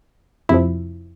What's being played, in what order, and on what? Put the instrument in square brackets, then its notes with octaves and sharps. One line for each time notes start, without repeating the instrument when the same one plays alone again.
[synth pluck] F2 C3 F3 E4